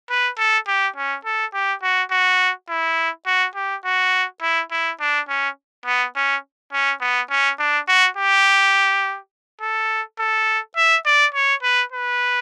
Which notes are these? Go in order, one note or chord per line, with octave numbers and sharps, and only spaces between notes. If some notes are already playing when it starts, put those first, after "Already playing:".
B4
A4
G4
C#4
A4
G4
F#4
F#4
E4
F#4
G4
F#4
E4
E4
D4
C#4
B3
C#4
C#4
B3
C#4
D4
F#4
G4
A4
A4
E5
D5
C#5
B4
B4